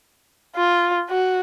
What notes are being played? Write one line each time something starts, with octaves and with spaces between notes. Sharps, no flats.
F4
F#4